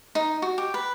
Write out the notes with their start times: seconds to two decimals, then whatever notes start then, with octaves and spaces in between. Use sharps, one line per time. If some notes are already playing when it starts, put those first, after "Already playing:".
0.15 D#4
0.42 F#4
0.58 G4
0.74 B4